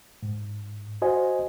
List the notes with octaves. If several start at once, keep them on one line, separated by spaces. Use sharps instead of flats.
G#2
F#4 C5 D#5 G#5